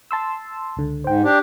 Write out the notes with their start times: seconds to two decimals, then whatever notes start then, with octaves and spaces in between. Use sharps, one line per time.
0.11 A5 C6 E6
0.76 C#2 D3
1.04 G#2 C5 G5
1.24 D4 G4